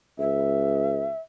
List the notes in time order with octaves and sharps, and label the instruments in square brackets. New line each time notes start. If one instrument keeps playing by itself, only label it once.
[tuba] C#2 [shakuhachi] E5